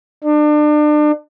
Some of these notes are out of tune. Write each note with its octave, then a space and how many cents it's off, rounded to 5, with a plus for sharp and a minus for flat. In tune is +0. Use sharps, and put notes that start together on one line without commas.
D4 +35